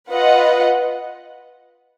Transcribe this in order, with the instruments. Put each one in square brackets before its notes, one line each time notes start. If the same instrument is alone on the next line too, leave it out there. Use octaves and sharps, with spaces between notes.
[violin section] F4 B4 D#5 F#5